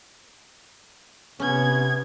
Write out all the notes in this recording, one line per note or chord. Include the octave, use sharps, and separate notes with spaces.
C3 B3 C#4 G#6